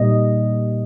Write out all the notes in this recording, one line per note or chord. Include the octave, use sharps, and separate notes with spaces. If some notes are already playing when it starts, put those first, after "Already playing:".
Already playing: A#2 G3 A#3 D#5